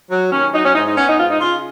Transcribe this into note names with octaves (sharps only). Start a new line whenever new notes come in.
F#3
D#2 C#4
F#3 D#4
C#4
G#2 D#4
D#4
B3 C#4
D#4
G#2 F4
D#4
C#3 F4